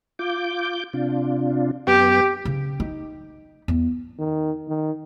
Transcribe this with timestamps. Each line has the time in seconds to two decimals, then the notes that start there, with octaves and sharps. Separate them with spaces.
0.19 F4 D6 G6
0.93 C3 D4 F4
1.87 F#2 B3 G4 G5
2.45 C#3
2.80 D#4
3.68 E2
4.19 D#3
4.68 D#3